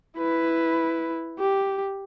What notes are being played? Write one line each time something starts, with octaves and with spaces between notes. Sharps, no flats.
E4 B4
G4